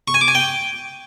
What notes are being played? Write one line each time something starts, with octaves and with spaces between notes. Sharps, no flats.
C#6
G#5
D6
G#5
G5